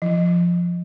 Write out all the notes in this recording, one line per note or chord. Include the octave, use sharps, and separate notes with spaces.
F3